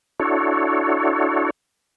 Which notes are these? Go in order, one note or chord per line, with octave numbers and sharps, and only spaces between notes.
D4 E4 F#4 A4 C#5